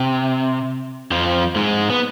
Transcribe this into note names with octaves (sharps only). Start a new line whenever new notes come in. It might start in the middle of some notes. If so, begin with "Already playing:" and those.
Already playing: C3
F2 F3
G#2 G#3
B3